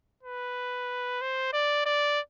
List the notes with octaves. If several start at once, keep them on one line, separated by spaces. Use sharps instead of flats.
B4
C5
D5
D5